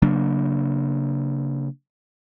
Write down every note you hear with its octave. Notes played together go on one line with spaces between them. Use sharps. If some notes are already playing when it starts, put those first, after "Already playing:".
C#3 F#3 A#3 D4